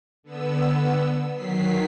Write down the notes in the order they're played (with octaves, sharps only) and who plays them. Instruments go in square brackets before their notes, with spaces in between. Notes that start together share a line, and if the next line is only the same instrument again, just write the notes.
[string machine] D3 B3 E6
D#3 F#3 B6 C7